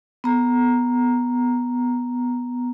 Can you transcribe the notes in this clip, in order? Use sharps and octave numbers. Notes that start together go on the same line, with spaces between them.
B3 A#5